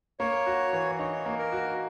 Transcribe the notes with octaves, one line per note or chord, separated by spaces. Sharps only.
A#3 C#5
F#4
E3
D#4 C#5
A#3
A#4
F#4